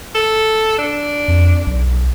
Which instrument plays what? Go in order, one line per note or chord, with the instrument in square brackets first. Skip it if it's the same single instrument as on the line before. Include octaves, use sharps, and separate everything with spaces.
[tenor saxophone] A4
D4
[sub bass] F2
B1